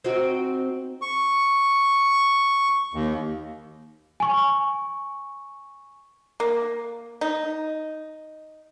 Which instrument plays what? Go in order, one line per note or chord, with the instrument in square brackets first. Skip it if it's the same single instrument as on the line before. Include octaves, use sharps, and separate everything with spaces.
[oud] C4 D#4 F#4
[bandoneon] C#6
D#2
[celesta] G#5 C#6
[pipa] A#3
D#4